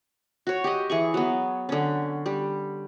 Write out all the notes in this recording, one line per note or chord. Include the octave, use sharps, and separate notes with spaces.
F#4 C#5
G4 D#5
E3 G#4 C#6
F#3 B3
D3 C#4
G3